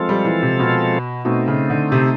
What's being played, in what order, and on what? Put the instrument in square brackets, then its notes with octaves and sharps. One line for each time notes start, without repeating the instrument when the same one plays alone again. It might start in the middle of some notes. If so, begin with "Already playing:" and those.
Already playing: [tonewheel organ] F3 G#3 C4 F4 A4
[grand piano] G3
E3
C3
B2
[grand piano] B2 [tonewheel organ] A3 C4 D#4
[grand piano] C#3
D3
C3